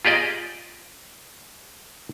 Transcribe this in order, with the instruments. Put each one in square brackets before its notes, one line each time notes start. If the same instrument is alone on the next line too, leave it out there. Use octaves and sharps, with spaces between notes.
[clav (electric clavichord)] F4 G4 G#4 D5 D#5